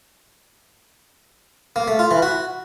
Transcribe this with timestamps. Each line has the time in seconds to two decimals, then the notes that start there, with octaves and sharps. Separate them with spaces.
1.76 A#3
1.88 A3
1.99 F4
2.11 E3
2.22 F#4